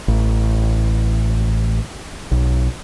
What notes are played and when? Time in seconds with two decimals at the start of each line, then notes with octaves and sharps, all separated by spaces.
0.08 A1
2.31 B1